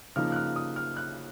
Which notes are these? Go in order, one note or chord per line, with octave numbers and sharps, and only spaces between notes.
C#3 F3 A#3 D#4 F6
F#6
F6
D#6
F6
F#6